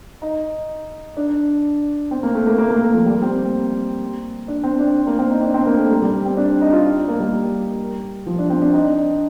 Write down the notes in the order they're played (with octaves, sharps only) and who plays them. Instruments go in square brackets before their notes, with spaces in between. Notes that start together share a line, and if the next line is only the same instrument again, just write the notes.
[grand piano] D#4
D4
C4
A#3
A3
A#3
A#3
A#3
A3
F3
G3
C4
A#3
D4
C4
D4
A#3
C4
D#4
D4
C4
A#3
A3
G3
G3
C4
D4
D#4
F4
D#4
A#3
G3
F3
D4
C4
D4
D#4
D4